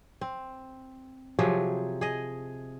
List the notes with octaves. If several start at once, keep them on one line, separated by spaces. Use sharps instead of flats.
C4
C3 F3 F#3 G#4
G#4 D#5